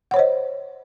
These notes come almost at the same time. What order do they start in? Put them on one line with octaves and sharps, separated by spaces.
F#5 C#5 C5 D#5